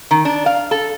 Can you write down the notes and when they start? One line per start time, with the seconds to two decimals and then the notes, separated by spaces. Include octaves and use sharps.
0.11 D#3
0.25 D4
0.46 F5
0.71 A4